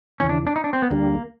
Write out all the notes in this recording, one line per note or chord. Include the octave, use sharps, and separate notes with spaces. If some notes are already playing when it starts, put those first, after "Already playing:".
D#2 C#3 E3 C#4
D4
D4
D#4
D4
C4
B3
D2 D3 G3 A#3